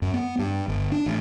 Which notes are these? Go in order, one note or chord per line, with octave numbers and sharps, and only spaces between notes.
F#2
B3
G2
G1
D4
A1